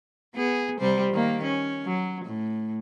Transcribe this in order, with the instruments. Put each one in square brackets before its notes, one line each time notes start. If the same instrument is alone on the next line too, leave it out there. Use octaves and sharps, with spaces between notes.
[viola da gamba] B3 G#4
C3 G3 C5
D#3 A#3
C#4
F#3
A2